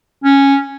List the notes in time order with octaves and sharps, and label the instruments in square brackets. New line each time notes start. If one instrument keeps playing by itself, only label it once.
[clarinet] C#4